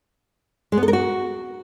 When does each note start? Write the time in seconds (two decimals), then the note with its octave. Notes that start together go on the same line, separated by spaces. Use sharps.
0.72 G#3
0.77 B3
0.83 A4
0.88 A#4
0.93 F#4